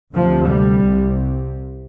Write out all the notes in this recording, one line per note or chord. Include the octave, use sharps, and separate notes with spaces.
D2 C3 F3
G3
C2 C3